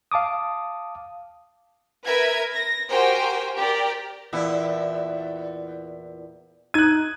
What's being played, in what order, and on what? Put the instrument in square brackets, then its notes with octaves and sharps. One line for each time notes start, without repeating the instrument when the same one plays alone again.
[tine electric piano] F5 A5 D6 D#6
[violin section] A#4 B4 E5 G#6
A#6
F#4 G4 A#4 C5 G5 G#5
G4 A#4 D5
[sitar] E2 A#2 E4
[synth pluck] D#4 D#7 [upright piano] F#6 G#6